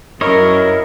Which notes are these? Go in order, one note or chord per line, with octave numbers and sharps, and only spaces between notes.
F#2 E4 A#4 C#5 D#5